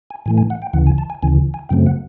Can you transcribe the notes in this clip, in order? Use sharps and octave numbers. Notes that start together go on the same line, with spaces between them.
G#5
A2 E3 A3 G#5
G#5
F#5
G5
D2 C#3 E3 F#5
G#5
A5
G#5
D2 C#3 E3 G#5
G#5
F#2 C#3 F#3 A3 C4 G5
F#5